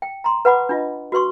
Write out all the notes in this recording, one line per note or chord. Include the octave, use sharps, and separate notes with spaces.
G5
A#5 C6
B4 F#5 B5 D6
D4 F4 D#5
F#4 B4 C6 C#6